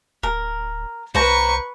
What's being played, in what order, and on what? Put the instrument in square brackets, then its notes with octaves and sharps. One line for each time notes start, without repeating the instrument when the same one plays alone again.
[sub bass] D1 [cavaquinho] A#4
[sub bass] C2 [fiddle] B4 C#6 [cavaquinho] C5 A#5